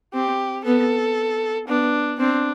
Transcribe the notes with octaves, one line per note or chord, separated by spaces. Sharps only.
C4 G4
B3 A4
B3 D4
C4 D4